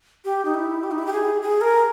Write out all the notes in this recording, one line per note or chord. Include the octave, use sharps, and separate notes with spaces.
G4
D#4
E4
G4
D#4
E4
G4
G#4
G#4
A#4